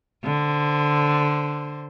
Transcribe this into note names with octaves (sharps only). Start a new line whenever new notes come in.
D3 C5